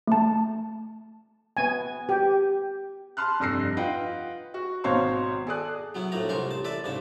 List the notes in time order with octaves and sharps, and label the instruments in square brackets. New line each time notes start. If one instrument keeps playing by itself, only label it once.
[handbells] A3 A5
[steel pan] B3 G#5
G4
[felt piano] A5 B5 C6 F6 F#6
F1 G2 E6 A#6 C7
F4 B4 D#5 F#5 G5
F#4
G#1 B2 C5 C#5 F5 C6
G#4 A4 D5 D#6 F#6
[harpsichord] F#3 B3 E4
A#1 A2 A3 A4 A#5
C2 G#3 A#4 C5 C#6
A1 A5
A4 B4 D5 E5 A5
C2 G#2 C#3 A5